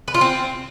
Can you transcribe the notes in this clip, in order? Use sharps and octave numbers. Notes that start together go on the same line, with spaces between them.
B4
F4
C4